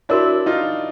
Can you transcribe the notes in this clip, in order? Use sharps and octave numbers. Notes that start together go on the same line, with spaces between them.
D4 E4 F#4 A#4 C#5
D#4 F4